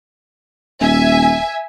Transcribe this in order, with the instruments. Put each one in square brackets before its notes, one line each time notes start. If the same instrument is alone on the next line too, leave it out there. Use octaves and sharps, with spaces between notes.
[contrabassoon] D#1 [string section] E5 G#5